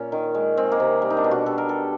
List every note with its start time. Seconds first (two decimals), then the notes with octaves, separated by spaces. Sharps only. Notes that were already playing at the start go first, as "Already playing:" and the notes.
Already playing: A#2 C#4
0.12 D#3
0.35 G#3
0.57 G#3 C4
0.72 A#3
0.80 C3
1.02 G3
1.10 D#4
1.17 D4
1.24 B2
1.31 F#4
1.46 G3 A4
1.58 A#4
1.68 G3 A4